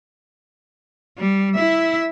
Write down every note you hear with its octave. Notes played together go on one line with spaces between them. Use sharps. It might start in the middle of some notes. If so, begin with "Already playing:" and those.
G3
E4 E5